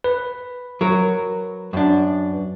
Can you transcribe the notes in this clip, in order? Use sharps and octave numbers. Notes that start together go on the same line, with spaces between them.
B4
F#3 A#4
F#2 D4